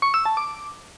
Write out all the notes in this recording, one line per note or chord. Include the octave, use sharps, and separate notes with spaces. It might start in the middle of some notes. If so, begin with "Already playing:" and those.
C#6
E6
A5
D6